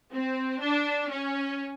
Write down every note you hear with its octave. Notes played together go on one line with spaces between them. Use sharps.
C4
D4
C#4